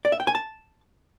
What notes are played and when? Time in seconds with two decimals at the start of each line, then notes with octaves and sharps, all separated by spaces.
0.05 D5
0.12 E5
0.20 G5
0.27 G#5
0.35 A5